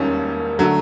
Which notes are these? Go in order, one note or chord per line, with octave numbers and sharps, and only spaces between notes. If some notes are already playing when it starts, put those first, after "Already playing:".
Already playing: E1 D#2 D#3 G3 A#3 C#4
D3 F#3 A3